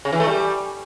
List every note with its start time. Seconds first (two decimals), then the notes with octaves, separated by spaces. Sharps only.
0.05 C#3
0.13 E3
0.20 A3
0.28 G3